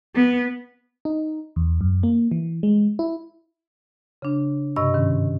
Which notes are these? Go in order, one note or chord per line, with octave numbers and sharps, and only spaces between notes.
B3
D#4
E2
F#2
A#3
E3
G#3
E4
C#3 D4
G2 C3 D#5 C#6 E6
G#2 D#3 C#4